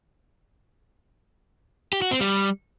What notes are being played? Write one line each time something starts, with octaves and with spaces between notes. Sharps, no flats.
G4
F#4
C4
G3